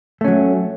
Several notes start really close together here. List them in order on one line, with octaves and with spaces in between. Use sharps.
A3 C#4 F#3